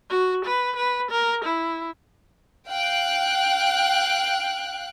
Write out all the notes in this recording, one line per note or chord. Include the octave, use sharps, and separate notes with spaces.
F#4
B4
B4
A#4
E4
F5 G5 F#6